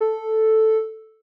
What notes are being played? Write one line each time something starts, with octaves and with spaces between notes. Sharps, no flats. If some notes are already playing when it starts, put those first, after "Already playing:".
A4